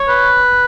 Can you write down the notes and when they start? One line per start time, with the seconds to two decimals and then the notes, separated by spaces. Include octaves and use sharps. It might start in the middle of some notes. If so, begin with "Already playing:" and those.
Already playing: C#5
0.09 B4